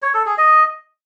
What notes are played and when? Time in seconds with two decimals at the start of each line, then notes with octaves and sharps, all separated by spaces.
0.02 C#5
0.14 A4
0.26 G#4
0.38 D#5